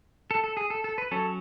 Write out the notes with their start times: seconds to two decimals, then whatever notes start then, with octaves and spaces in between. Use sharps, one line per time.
0.31 A4
0.44 A4
0.57 G#4
0.70 A4
0.84 A4
0.98 B4
1.11 F#3 C#4 A4